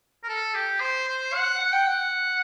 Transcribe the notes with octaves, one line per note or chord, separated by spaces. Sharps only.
A#4
A4
G4
C5
C5
F#5
F#5
G5
F#5